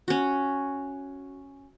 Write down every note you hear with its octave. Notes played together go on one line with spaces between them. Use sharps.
C#4 F#4